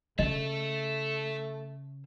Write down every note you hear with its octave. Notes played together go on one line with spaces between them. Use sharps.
C#3 A3 D#5 E5 A5